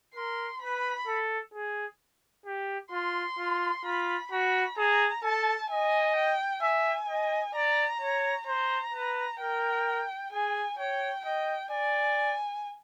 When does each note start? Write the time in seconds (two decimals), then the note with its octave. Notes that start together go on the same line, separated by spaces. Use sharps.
0.15 A#4 C6
0.61 B4 B5
1.07 A4
1.54 G#4
2.46 G4
2.92 F4 C6
3.38 F4
3.84 F4 B5
4.31 F#4 B5
4.77 G#4 A#5
5.23 A4 A5
5.70 D#5 G#5
6.16 G5
6.62 E5 G#5
7.09 D#5
7.55 D5 A#5
8.01 C#5
8.47 C5 A#5
8.93 B4
9.39 A#4 G5
10.32 G#4 G#5
10.78 C#5 G5
11.25 D#5 G5
11.71 D5 G#5